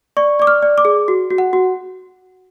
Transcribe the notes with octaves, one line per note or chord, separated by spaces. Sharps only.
D5 C#6
D5 D6
F6
D5
D6
G#4
F#4
F#4
F#5
F#4